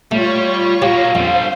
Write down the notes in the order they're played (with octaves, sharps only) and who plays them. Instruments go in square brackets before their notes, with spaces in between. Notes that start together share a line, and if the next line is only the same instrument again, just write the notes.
[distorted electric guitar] G3 [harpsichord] A3 [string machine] F4 C#5 C#6
[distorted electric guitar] F#3 A#3 [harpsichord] G4 [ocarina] F5
[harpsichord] F2 [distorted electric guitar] D3 G3 [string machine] C5